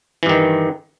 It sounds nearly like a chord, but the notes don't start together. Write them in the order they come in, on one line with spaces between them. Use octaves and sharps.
E3 G2 D#3